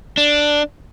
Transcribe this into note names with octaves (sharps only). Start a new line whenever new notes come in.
D4